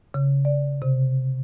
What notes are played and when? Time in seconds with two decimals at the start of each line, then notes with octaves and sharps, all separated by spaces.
0.14 C#3
0.45 D5
0.82 C3